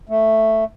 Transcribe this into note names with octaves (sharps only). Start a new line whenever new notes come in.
A3